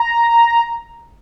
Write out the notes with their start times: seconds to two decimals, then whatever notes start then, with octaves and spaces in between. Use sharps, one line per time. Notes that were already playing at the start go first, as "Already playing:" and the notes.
Already playing: A#5